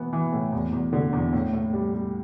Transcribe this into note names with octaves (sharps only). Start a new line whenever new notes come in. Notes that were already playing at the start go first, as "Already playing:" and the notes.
Already playing: E3 B3
E3
A2
E2
E2
D3
E2
A2
A2
G3
G3